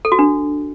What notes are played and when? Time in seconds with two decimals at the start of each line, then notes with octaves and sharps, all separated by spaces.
0.05 A4
0.12 F#4
0.19 D4